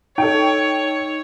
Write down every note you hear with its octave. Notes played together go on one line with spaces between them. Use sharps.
D#4 A4 C#5 G5